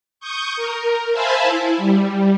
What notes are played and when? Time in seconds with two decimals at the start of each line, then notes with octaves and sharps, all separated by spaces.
0.20 C#6 D#6 G6
0.56 A#4
1.12 C5 E5 F5 G#5 A5 B5
1.43 E4
1.77 G3